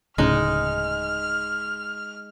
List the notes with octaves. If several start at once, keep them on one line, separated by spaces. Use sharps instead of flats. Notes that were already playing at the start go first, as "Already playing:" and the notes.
D1 A2 C#3 G#3 D#4 F6